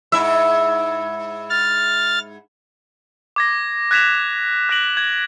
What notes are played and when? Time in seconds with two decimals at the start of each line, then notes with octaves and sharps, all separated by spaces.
0.12 G#2 E4 E5
1.50 F6 A6
3.36 D6 G#6 A#6
3.91 F#6 G#6 B6 E7 F7
4.69 F#6 A#6 D7 F#7
4.97 G#6